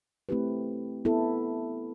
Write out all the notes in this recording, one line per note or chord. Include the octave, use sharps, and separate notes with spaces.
A3 C4 E4 G4 B4
B3 E4 A4